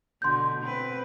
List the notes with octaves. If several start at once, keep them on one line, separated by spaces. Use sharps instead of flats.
B2 D3 C6 G6
C4 B4